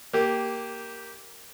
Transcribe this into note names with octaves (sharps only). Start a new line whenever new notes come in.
A#3 G4